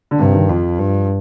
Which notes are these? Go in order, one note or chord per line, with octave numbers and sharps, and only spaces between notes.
D3
G2 C3
D#3
F2 F3
G2